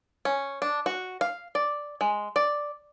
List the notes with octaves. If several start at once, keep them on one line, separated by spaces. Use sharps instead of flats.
C#4
D4
F#4
F5
D5
G#3
D5